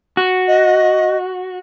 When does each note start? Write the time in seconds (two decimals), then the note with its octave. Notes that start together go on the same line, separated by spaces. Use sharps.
0.17 F#4
0.48 D#5